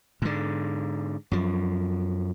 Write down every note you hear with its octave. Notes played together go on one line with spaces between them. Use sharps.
G#2 D3
F#2 F3